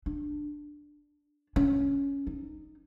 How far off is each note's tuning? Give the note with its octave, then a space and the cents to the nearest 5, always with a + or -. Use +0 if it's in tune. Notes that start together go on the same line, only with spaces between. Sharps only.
D4 +5
C#4 +10
D#4 -15